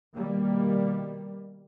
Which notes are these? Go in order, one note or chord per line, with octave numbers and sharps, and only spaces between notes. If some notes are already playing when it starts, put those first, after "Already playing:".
B2 D#3 G3 A#3